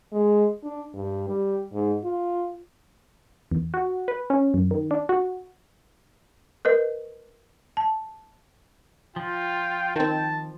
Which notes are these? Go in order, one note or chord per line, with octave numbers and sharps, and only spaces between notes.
G#3
D4
G2
G3
G#2
F4
E2
F#4
B4
C#4
F#2
D#3
D4
F#4
A#4 B4 D#5
A5
F3 F4 G5
D#3 C4 A5